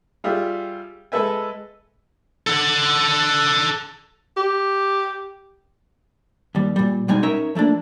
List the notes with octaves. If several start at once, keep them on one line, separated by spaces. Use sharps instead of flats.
G3 F4 G4 G#4 E5
G#3 A4 B4 E5 G#5
A4 F#5
G4
D#2 G3
A#2 G3
B2 G3 G#3 D#4 G#5
C#4 D#4 A#4 C#5 E5
F3 A3 A#3 D4